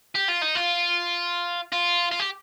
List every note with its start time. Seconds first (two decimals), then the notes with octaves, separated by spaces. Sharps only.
0.15 G4
0.29 F4
0.42 D#4
0.55 F4
1.72 F4
2.11 F4
2.20 G4